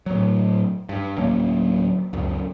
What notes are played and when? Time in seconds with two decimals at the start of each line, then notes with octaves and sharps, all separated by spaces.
0.06 A2 F#3
0.89 G2
1.18 D1 F#3 A#3 C#4
2.13 C#2 F#2